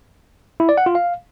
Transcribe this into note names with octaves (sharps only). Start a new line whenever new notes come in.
E4
D5
F#5
F4
F5